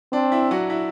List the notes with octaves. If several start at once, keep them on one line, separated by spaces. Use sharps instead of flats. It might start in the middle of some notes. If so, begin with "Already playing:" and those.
C4 D4
E4
F#3 F#4
E4